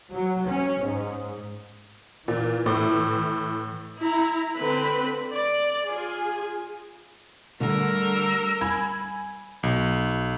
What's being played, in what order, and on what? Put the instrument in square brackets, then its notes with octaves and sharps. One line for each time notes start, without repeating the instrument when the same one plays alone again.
[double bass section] F#3
C#4
G#2
[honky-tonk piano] A#2 [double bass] E3
[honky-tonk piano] A2
[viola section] E4 A#5
D3 C4 B4 B5
D5
F4 G#4 G#5
[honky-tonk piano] D3 A3 [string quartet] G3 A#4 E6
[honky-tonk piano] G#5 B5 G#6
[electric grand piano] B1